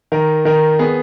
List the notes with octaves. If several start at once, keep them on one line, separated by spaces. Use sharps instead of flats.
D#3 A#4
D#3 A#4
B3 G#4